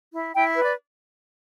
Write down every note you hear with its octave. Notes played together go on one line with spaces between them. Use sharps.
E4
E4 G5
B4
D5